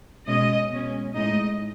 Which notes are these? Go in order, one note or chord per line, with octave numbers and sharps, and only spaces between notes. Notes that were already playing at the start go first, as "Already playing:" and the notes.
B2 G#3 C#4 D#5
B2 G#3 C#4
A2 G#3 D#4 D#5